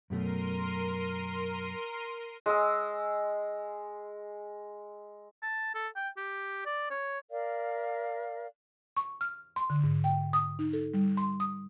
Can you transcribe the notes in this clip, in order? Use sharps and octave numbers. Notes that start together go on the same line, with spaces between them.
F#2 B2 A3 A#4 C6 D#7
G#3 E6
A5
A4
G5
G4
D5
C#5
A#4 D5 F5
C#6
F6
C6
D3
G#2
G5
D#6
D#4
A4
G3
C6
D#6